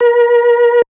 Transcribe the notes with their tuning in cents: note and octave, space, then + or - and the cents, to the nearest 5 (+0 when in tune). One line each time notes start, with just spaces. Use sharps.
A#4 +40